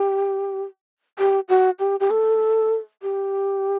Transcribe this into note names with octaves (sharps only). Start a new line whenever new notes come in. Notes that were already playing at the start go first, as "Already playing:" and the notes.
Already playing: G4
G4
F#4
G4
G4
A4
G4